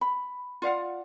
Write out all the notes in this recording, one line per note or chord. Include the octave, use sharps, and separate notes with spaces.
B5
F4 D5 F5 F#5